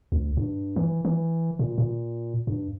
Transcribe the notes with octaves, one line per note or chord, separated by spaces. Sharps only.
D2
G2
E3
E3
A#2
A#2
G2